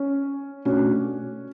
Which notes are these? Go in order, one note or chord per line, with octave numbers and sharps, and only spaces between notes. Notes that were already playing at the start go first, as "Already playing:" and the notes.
Already playing: C#4
B2 A3 C#4 D4 F#4